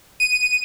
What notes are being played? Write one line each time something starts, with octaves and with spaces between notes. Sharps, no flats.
D#7